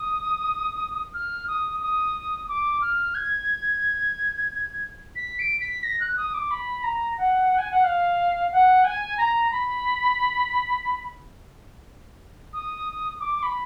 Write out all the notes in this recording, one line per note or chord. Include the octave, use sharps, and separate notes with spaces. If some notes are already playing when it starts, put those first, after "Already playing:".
Already playing: D#6
F6
D#6
D#6
D6
F6
G#6
B6
D7
B6
A#6
F#6
D#6
D6
B5
A#5
F#5
G#5
F#5
F5
F#5
G#5
A#5
B5
D#6
D6
D6
B5